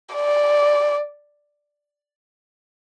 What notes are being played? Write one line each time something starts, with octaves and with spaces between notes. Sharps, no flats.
D5